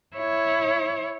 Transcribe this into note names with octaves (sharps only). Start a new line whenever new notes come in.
E4 C#5